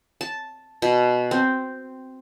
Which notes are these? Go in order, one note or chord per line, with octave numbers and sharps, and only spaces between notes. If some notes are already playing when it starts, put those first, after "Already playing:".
A5
B2
C4